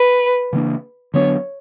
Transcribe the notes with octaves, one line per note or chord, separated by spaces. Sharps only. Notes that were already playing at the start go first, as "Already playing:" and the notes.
Already playing: B4
C#3 E3 A#3 D4
D3 F#3 B3 D4 C#5